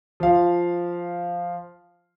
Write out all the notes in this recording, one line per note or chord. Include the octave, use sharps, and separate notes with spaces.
F3 F5